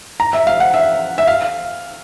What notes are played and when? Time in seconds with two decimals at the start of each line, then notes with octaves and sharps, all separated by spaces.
0.20 A#5
0.33 E5
0.47 F5
0.60 F#5
0.74 E5
1.18 E5
1.27 F5